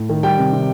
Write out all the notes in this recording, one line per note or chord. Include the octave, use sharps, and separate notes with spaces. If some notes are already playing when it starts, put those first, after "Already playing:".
Already playing: A2
D#3
G3 G5
C3
C3